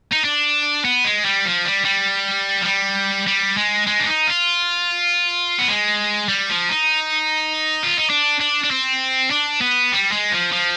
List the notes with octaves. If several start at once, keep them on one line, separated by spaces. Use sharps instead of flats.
D#4
D4
B3
G#3
G3
F3
G3
G3
F3
G3
G3
G#3
G#3
D4
D#4
F4
B3
G#3
G3
F3
D#4
F4
D#4
D4
D4
D4
C4
D4
B3
G3
G#3
F3
F3